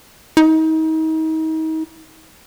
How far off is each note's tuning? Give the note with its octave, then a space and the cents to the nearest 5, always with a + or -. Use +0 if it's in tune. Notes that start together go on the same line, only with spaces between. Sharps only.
D#4 +35